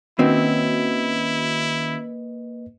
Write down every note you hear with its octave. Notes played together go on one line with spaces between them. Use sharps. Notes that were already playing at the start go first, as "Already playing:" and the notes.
D#3 A#3 C4 C#4 E4 F#4 B4 D#5